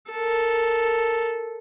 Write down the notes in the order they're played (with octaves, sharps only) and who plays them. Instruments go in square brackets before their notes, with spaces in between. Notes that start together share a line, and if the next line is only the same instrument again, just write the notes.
[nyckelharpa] A4 A#4